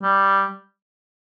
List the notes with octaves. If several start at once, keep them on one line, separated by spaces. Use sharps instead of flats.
G3